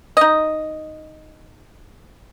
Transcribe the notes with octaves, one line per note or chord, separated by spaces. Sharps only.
D#4 D#5